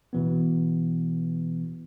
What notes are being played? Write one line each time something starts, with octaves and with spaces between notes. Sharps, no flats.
B2 E3 B3